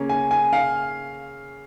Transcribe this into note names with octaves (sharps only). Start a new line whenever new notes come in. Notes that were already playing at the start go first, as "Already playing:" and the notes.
Already playing: C#3 A#3 C#4
G#5
G#5
F5